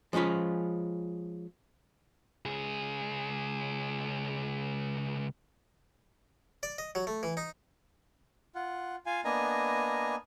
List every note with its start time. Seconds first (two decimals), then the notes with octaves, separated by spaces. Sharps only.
0.13 F3 G#3 C#4 F4 B4
2.45 C#2 G#4
6.63 D5
6.78 D#5
6.95 F#3
7.07 A3
7.23 E3
7.37 D#4
8.55 F4 F#5
9.06 F4 F5 G#5
9.25 A#3 B3 D4 D#5 G#5 A#5